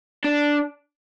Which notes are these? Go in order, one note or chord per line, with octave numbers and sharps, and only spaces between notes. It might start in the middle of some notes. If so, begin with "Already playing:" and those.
D4